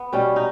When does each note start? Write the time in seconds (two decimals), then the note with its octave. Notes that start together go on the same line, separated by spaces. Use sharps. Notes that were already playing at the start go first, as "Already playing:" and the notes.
Already playing: B3
0.13 B2 G3 C#4
0.36 D#4